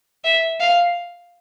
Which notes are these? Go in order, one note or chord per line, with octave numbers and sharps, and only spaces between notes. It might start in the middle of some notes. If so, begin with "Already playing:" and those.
E5
F5